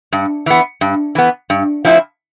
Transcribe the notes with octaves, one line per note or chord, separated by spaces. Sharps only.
G2
E3 B3
G2
E3 B3
G2
F3 A3 C4 E4